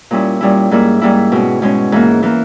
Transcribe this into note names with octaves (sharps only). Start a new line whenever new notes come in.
A#2 G3 C#4 E4
A#2 G3 C#4 E4
G#2 G3 A#3 E4
G#2 G3 A#3 E4
B2 G#3 C#4
B2 G#3 C#4
G#2 E3 A#3
E3 A#3